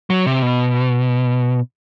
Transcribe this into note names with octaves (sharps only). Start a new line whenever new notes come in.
F#3
C3
B2